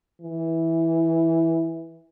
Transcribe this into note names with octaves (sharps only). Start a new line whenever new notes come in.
E3